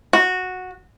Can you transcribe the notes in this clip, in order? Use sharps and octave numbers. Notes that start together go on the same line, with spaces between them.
F#4